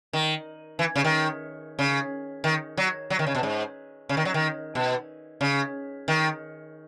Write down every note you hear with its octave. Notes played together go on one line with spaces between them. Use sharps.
D#3
E3
C#3
D#3
C#3
D#3
F#3
F#3
D#3
C#3
B2
G#2
C#3
D#3
F#3
D#3
B2
C#3
D#3